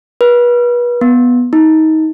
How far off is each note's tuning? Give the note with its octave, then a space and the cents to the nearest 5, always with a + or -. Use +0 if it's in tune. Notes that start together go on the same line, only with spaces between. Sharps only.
B4 -35
B3 -5
D#4 +25